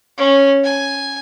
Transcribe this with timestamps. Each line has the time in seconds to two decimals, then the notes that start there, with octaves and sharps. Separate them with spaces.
0.18 C#4
0.64 G#5